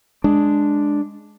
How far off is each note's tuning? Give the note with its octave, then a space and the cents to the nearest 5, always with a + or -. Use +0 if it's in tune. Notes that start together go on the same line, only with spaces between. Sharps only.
G#3 +0 D4 +0